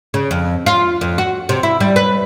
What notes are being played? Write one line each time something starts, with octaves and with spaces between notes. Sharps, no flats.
C#3
F2
F4
F2
F#4
C3
E4
G3
B4